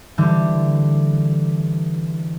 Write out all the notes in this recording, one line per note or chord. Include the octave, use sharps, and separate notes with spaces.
D3 E3 G3 G4